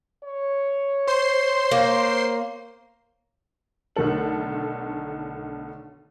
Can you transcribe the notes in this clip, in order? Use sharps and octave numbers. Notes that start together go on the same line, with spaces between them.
C#5
C5 C6 C7
A#3
B1 D3 D#3 A3 A4 F#7